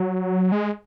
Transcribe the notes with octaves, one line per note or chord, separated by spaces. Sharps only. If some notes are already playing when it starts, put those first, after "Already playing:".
Already playing: F#3
G#3